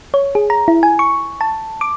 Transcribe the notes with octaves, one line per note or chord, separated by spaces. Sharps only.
C#5
G#4
A#5
E4
G#5
C#6
A5
D6